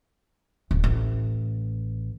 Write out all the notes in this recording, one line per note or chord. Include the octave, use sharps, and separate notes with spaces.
D1
A1